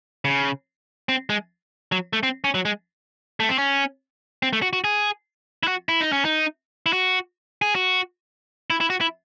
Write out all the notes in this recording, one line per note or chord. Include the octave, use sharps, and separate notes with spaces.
C#3
C4
G#3
F#3
A3
C4
C#4
F#3
G#3
A3
C4
C#4
C4
A3
F#4
F#4
G#4
E4
F#4
E4
D#4
C#4
D#4
E4
F#4
G#4
F#4
E4
E4
F#4
E4